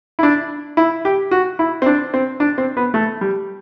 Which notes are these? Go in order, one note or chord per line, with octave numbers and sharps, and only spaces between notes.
E4
D4
E4
G4
F#4
E4
C4
D4
C4
D4
C4
B3
A3
G3